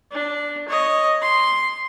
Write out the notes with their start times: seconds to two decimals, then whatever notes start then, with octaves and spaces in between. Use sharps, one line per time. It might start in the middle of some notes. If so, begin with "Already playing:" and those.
0.12 D4
0.68 C#5 D#5
1.22 C6